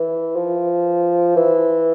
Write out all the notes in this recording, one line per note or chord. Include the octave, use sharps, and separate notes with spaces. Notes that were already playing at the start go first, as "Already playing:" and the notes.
Already playing: E3
F3
E3